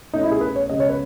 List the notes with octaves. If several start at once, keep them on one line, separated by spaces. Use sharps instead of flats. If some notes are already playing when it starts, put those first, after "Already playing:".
B2 A3 C#4 D#4
E4
G#4
B4
C#5
C#3 G#3 B3 D#5
C#5
B4